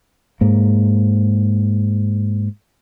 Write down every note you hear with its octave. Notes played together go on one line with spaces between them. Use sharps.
G#2 A#3